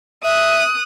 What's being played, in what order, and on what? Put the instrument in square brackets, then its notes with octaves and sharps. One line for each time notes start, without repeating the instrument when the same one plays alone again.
[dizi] E5 [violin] D#6 F#6